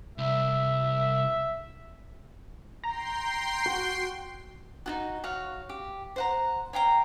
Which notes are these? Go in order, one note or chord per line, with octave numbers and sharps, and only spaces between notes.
C2 E5
G5 A#5 C6 C7
F#4
D#4 F4 F#4
F#4 C#5 F5
G4
C5 F#5 A#5
C#5 F5 G5 A#5